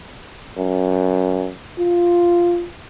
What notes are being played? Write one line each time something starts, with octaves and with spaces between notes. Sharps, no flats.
F#2
F4